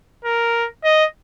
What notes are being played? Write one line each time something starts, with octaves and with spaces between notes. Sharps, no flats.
A#4
D#5